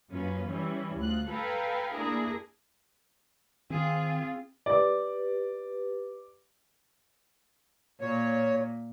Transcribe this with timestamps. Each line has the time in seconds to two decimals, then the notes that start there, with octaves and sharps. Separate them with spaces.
0.11 F#2 A#3 C#4 F4 B4
0.47 E3 G3 C#4 E4
0.98 D2 F4 F#6
1.30 A4 B4 F5 G5 G#5 A#5
1.91 A3 A#3 D4 E4 G#4 A#4
3.70 D#3 C4 F4 G#4
4.66 G4 B4 D5 D6
8.01 A#2 C#5